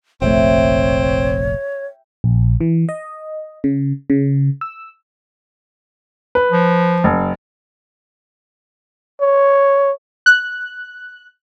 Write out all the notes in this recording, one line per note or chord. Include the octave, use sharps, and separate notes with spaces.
F1 A#1 A3 C4 C#5 E5 G5
A#1
E3
D#5
C#3
C#3
E6
B4
F3
F#1
C#5
F#6